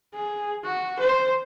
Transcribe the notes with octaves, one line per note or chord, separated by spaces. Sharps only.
G#4
F#4
C5